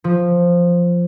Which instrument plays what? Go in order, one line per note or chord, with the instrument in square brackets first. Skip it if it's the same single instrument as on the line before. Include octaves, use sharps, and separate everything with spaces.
[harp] F3